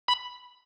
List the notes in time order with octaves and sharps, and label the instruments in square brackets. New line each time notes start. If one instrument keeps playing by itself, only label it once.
[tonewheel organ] B5